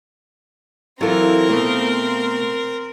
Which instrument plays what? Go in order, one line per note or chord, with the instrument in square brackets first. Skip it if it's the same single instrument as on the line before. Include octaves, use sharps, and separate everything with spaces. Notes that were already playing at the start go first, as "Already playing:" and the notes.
[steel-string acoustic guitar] E3 F#3 E4 [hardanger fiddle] C4 A#4 [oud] F4 A4
[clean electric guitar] B2 A3 [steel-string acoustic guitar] A#3